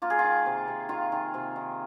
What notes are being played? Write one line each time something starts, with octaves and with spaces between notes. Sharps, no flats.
A#3 F4
G#4
F4
D#3
C3
C3
D#3 F4
D#3
C3
D#3